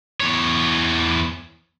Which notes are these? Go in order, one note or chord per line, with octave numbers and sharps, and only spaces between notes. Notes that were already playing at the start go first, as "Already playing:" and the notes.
E2 C#5